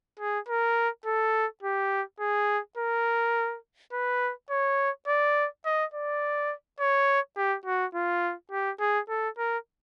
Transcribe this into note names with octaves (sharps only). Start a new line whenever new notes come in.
G#4
A#4
A4
G4
G#4
A#4
B4
C#5
D5
D#5
D5
C#5
G4
F#4
F4
G4
G#4
A4
A#4